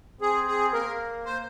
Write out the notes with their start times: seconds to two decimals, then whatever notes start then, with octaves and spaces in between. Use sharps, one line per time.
0.21 C4 G#4
0.48 G#4
0.73 A#3 A#4
1.26 C5